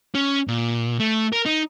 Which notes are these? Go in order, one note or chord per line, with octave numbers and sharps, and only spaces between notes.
C#4
A#2
A3
A#4
D#4